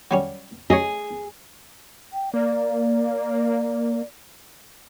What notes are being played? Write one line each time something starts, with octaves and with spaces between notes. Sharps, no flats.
F#3 G3 C#4
G#4 C#5 D#5 A#5
G5
A#3 D5